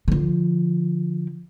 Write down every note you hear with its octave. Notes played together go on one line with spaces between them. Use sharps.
D3 F3